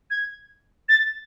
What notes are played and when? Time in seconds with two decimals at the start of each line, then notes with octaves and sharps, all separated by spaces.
0.10 G#6
0.89 A6